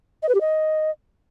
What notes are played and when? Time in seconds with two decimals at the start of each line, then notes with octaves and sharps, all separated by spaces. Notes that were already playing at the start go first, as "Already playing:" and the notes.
0.23 D#5
0.29 B4
0.35 G4
0.41 D#5